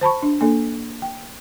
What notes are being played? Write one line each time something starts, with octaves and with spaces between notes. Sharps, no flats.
C5 A5 B5 C#6
D4
A#3 D4 A4
G5